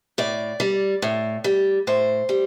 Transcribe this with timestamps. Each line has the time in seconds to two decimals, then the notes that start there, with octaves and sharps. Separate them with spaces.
0.18 A2 D5
0.60 G3
1.02 A2
1.44 G3
1.87 A2 C5
2.29 G3